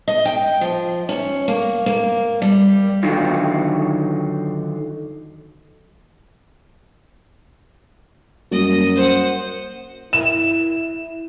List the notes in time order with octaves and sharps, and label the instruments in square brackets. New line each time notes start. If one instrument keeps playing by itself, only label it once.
[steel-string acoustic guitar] D#5
G5
F3
C#4
A#3
A#3
G3
[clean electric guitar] D3 D#3 F#3 D#4 F4
[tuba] F#2 [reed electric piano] G3 A#3 F#4 [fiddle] D#5
[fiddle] C5 F#5
[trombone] E4 [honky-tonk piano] E7